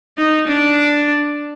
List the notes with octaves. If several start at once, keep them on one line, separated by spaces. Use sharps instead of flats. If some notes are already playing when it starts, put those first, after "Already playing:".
D#4
D4